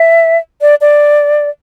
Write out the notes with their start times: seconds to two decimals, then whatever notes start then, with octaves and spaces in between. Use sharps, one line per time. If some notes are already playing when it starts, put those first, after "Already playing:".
Already playing: E5
0.61 D5
0.81 D5